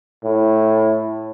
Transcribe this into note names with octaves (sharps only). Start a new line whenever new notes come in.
A2